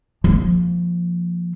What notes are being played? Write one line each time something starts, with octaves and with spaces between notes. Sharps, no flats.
F3 A#3